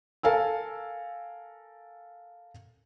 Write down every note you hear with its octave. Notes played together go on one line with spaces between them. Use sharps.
A4 A#4 F5 G#5 E6